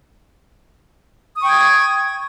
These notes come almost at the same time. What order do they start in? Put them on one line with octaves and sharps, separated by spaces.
D#6 C#6 G5 G#6